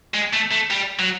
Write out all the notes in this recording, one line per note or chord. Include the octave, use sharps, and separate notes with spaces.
G#3
A3
A3
G3
F#3